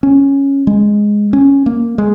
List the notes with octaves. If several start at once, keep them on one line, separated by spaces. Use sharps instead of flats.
C#4
G#3
C#4
A#3
G#3